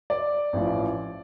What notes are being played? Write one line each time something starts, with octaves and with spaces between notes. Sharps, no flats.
D5
A1 A2 F3